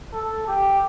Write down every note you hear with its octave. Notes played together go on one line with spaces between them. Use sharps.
A4
G4